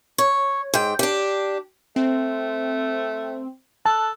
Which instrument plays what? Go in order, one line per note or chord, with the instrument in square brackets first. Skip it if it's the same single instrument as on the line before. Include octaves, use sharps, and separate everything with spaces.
[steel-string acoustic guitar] C#5
G#2 G5
D4 G4
[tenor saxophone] A3 [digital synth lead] C4
[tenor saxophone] A4 [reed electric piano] A5 [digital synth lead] F#6